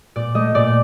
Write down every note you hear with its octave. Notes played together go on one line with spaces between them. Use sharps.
A#2 D5
A3 D#5
A#2 D5